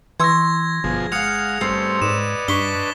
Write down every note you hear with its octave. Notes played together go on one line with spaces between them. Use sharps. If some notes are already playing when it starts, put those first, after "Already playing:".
E3 C6 C#6 E6 G#6 A#6
G1 B2 F3 G#4
G#3 F5 F#5 D#6 F6 C#7 F7
G2 G3 A3 C4 C#4
G#2 B4 D5 D#5 E7
G2 D4 C#6 B6 G7